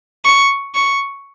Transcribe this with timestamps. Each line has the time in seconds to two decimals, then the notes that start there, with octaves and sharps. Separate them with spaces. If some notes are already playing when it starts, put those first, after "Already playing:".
0.24 C#6
0.75 C#6